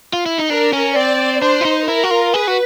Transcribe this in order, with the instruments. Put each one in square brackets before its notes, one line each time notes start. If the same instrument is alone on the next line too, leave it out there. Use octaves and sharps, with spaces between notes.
[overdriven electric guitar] F4
E4
D#4
[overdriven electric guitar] D4 [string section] A#4
[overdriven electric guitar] C#4
[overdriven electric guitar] C4 [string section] D5
[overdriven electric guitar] D4 [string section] C5
[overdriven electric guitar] E4
D#4
[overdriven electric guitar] E4 [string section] A#4
[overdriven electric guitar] F#4
F4
[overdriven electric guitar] G#4 [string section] B4
[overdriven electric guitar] F#4